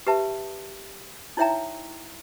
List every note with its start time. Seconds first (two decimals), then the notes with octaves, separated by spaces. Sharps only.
0.07 G4 B4 E5 A5
1.37 D#4 E4 C#5 E5 G5 A#5